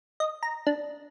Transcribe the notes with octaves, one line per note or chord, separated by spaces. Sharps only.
D#5
A#5
D4